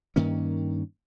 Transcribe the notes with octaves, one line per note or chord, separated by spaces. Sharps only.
G2 D#3 A#3 C#4